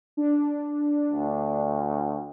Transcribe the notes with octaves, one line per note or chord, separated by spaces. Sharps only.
D4
D2